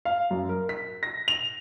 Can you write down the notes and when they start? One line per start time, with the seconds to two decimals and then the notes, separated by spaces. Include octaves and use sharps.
0.05 F5
0.30 F#2
0.49 A#4
0.69 B6
1.03 A#6
1.28 F7